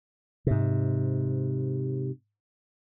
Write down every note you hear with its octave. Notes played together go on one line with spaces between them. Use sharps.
G#2 C3